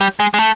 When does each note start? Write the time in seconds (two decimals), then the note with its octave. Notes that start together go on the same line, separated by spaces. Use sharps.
0.01 G3
0.20 G#3
0.34 G#3
0.39 A3